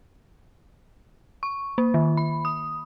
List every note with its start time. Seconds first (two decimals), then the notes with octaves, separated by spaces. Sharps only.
1.43 C#6
1.78 A#3
1.94 D#3
2.17 B5
2.45 D#6